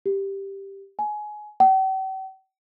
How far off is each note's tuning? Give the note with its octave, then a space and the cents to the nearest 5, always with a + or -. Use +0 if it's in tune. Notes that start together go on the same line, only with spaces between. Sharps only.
G4 +0
G#5 +20
G5 -45